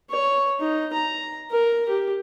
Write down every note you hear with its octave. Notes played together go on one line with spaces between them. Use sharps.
C#5
D#4
A#5
A#4
G4